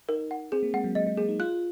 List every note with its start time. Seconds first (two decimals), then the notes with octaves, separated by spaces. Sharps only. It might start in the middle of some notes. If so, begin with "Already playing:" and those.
0.09 D#4 A#4
0.31 F#5
0.52 C4 G#4
0.63 A#3
0.74 G#3 F#5
0.84 F#3
0.95 G#3 D#5
1.07 G#3
1.17 A#3 G#4
1.29 D#4
1.40 F4 F#6